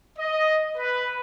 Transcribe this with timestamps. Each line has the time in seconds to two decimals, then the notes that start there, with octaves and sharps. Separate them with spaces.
0.19 D#5
0.77 B4